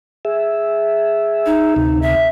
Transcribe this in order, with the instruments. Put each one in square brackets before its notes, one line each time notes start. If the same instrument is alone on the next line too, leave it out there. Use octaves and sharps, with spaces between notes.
[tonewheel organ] G#4 E5
[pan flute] D#4
[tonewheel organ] D2 C3
[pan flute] E5